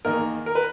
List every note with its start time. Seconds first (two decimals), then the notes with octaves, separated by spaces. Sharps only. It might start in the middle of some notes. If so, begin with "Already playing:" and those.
0.05 E2 D#3 A#3 A#4
0.46 A#4
0.55 B4